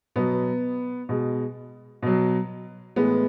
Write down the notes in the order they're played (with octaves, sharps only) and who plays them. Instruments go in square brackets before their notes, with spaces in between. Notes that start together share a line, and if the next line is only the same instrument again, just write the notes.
[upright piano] B2 F#3 B3
B2 G#3
B2 F#3
A2 E3 G#3 B3